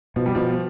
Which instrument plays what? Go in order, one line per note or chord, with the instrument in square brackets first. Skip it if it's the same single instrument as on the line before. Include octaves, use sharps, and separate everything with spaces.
[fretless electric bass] B2 [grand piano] F3
[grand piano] G3
[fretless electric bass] B2 [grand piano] F3